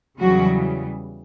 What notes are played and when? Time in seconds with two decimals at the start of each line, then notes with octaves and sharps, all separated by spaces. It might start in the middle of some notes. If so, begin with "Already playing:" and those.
0.19 E2 C#3 E3 F#3 G3 F#4